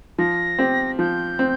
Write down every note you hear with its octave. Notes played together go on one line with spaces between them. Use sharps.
F3 A#6
C4 G4
F3 G6
C4